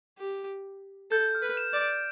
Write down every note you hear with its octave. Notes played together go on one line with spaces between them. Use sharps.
G4
A4 G6
F6
B4
E7
D5
D7